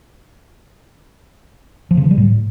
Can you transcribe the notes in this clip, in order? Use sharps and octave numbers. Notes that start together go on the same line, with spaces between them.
F3
C#3
E3
G3
A2